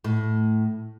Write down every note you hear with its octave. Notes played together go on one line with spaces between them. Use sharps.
A2